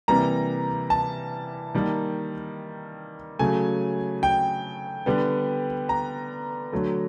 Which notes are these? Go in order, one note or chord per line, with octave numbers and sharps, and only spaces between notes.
C3 E3 G3 A#3 A#5
A5
D#3 G3 A#3
C#3 F#3 A3 G#5
G5
D3 G3 B3
A#5
D3 F#3 A3